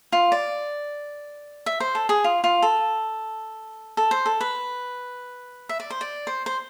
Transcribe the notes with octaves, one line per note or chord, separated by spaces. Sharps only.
F4
D5
E5
C5
A4
G#4
F4
F4
A4
A4
C5
A4
B4
E5
D5
C5
D5
C5
C5